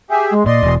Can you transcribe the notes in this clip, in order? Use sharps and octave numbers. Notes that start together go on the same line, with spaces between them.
G4 G#4 E5 G#5
G#3
A#2 D5 D#5 C6
E1